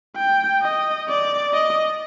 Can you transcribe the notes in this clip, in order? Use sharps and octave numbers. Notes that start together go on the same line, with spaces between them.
G5
D#5
D5
D#5